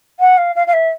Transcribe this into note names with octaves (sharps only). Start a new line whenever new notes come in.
F#5
F5
F5
F5
E5